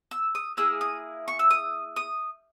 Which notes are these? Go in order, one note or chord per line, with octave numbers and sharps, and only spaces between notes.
E6
D#6
A#3 E4 G#4 E6
D#6
C#6
E6
D#6
D#6